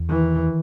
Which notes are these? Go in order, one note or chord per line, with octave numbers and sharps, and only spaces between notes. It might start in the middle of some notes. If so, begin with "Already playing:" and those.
Already playing: E2
D#3 E3